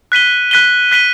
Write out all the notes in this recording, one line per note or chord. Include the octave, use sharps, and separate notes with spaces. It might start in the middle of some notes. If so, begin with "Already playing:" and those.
F#6 B6 D#7 G7
F#6 B6 D#7 G7
F#6 B6 D#7 G7